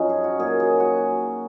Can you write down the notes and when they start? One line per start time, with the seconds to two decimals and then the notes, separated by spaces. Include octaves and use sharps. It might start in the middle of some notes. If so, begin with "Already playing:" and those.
Already playing: F#2 F3 C#4 D#4
0.09 G#4
0.24 F#4
0.39 A#2 F#3 G#4
0.60 G#4
0.80 F#4